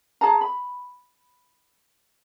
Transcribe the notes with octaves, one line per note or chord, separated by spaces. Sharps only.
G#4 A5 A#5
B5